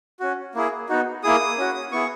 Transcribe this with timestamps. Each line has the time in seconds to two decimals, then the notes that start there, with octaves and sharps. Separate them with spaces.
0.20 C#4 F#4
0.55 A#3 E4 G#4
0.89 B3 D#4 F#4
1.23 A#3 E4 G#4 D#6
1.58 C#4 F#4
1.92 B3 E4 G#4 C#6